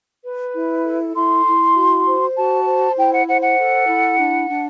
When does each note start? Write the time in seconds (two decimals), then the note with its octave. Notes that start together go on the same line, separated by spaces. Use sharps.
0.23 B4
0.53 E4
0.84 A4
1.15 E4 C6
1.45 E4
1.75 F#4
2.05 C5
2.36 F#4 A5
2.66 C5
2.96 E4 G5
3.12 F#5
3.28 C5 F#5
3.42 F#5
3.57 A4
3.87 E4
4.19 D4
4.49 D4